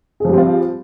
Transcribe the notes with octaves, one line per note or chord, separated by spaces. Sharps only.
F3 G3 C4 F4 G#4